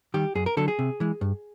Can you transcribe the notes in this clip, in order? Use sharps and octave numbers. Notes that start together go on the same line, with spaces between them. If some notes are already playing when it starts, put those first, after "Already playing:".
D#3 G3 G4
F#2 G#4
A#4
D3 F#3 A4
G#4
C3
E3 G#3
G2